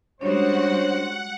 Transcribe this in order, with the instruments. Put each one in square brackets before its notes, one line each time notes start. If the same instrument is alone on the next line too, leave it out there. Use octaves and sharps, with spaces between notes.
[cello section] G3 G#3 F#4 [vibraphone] C#4 D4 C#5 [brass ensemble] C5 [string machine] F#5